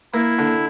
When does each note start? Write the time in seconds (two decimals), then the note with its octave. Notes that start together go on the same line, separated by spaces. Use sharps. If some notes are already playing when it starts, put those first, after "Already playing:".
0.13 A#3 E4
0.39 D3